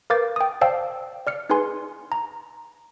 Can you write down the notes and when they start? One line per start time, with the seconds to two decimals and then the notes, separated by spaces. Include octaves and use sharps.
0.10 A#4 B4 F5 D6 G6 A6
0.36 G5 D#6
0.61 C5 D5 F5 G5 A5 E6
1.27 D5 F6 C#7
1.50 D#4 G#4 B4 G#5 C6
2.12 A#5